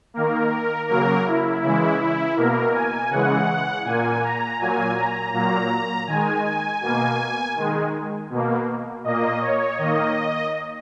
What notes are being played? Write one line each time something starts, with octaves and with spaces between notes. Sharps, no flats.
D#3 A#3 A#4
C#3 F#3 A#3 A#4
E4
C#3 E3 G#3 E4
E4
B2 A#3 A#4
G#5
C#3 E3 G#3 F#5
A#2 A#3 G#5
A#5
A#2 F#3 A#3 G#5
A#5
A#2 F#3 A#3 A#5
D#3 G#3 G#5
G#5
B2 A#3 G#5
D#3 G#3
B2 A#3
A#2 A#3 D#5
C#5
D#3 A#3 D#5